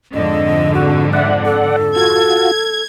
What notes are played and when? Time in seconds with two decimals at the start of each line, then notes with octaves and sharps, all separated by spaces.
0.14 F2 G#2 D3 D#5
0.74 F#4
1.13 D5 E5 F#5
1.45 A4
1.96 F4 F#4 G#6